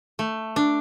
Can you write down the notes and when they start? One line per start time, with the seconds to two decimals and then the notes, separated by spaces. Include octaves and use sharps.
0.19 A3
0.56 D4